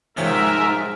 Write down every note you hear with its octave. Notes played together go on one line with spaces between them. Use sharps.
G#2 C3 F3 C#4 A#4 E5